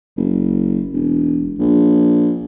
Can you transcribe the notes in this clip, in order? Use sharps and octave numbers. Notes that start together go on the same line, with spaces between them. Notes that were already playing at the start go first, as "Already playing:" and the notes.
F#1
E1
A#1